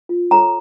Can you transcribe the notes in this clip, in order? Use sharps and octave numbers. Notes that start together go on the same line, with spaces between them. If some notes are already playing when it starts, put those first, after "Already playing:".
F4
A4 C#5 A#5